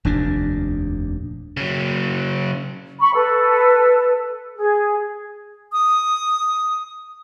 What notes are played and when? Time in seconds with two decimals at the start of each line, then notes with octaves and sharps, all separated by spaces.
0.05 F1 D#2 A#2 D4
1.57 C#3 F#3
3.00 B5 C#6
3.14 A4 B4
4.57 G#4
5.73 D#6